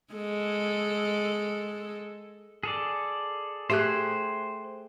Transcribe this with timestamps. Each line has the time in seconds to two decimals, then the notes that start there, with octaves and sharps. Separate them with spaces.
0.13 G#3 A4
2.63 G#4 A4 D5
3.70 A3 G4 G#4 C5 F#6